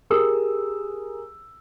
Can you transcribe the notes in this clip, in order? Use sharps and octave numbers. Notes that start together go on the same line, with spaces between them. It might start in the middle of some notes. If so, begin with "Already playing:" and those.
G4 G#4 A#4 D#6 E6